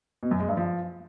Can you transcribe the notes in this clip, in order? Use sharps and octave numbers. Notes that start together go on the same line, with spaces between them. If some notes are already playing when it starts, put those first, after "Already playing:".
B2
F#2
G#3
G2
F3